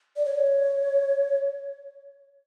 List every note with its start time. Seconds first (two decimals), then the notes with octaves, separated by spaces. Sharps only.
0.16 D5
0.26 C#5